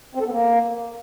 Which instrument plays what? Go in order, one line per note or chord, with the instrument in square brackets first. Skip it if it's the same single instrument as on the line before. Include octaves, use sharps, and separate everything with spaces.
[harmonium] C4
A4
B3
A#3